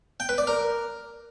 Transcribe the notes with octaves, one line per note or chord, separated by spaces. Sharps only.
G5
B4
D5
A#4